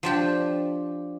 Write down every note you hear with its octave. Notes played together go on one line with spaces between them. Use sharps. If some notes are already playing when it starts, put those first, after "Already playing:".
F3 D4 G4